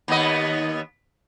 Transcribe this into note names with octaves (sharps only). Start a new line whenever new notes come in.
D#2 B3 D#5